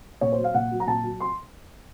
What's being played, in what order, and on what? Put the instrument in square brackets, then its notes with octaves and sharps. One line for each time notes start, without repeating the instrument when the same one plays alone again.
[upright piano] A#2 C#5
C5
F#3
F5
A#2 F#5
F#3
A#5
A#2 A5
F#3
C6